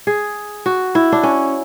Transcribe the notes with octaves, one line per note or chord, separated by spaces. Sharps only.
G#4
F#4
E4
D4
C#4